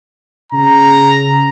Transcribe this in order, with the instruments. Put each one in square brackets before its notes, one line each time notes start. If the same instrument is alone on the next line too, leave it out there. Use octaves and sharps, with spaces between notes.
[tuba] C#3 [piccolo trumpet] A#5